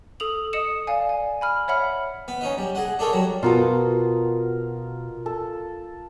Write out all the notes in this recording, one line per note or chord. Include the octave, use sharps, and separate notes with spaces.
A4 D#6 F7 F#7
D#5 D#6 C#7 E7
D5 F5 G#5
G#5
G#5 B5 F6
C#5 E5 F#5 B5 F6
B3
C#4 D#4 D#5
G3
G#4 D#5 F#5
D4 D#4 A4 A#4 C#5
F#3 G3 A#5
B2 F4 F#4 A4 A#4 D#6
A4